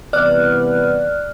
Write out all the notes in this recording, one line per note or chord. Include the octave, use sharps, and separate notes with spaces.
C2 E3 B3 D5 F6 F#6